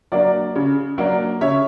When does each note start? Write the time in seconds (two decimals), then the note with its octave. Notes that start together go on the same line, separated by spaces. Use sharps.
0.12 F#3 A#3 D4 D5
0.55 C#3
0.98 F#3 A#3 D4
1.41 C#3 C#5 E5